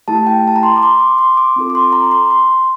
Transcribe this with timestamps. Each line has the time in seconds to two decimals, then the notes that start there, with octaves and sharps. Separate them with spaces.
0.08 A3 E4 G4 A5
0.27 G5
0.47 A5
0.56 A#5
0.63 C6
0.76 D6
0.83 C6
1.00 D6
1.18 C6
1.37 D6
1.56 C4 F4 A4
1.70 D6
1.75 C6
1.92 A#5
2.05 D6
2.11 C6
2.30 C6